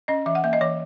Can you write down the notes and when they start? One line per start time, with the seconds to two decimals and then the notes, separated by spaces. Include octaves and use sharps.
0.08 C#4 D#5
0.26 E3 E5
0.35 F#5
0.44 A#3 E5
0.53 D#5
0.61 E3 C#5